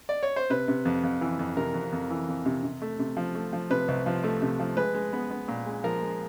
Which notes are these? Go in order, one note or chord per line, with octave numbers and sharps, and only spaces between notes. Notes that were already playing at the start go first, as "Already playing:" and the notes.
D5
C#5
C5
C3 B4
C3
F2
F2
E3
F2
C3 A#4
F2
F2
E3
F2
C3
C3
A3
C3
F3
A3
F3
C3 B4
C2
F3
A3
C3
F3
G#3 B4
G#3
B3
B3
A#2
G#3
F3 A#4
G#3